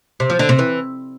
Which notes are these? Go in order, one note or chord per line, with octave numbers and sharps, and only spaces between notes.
C3
F3
D3
C3
E3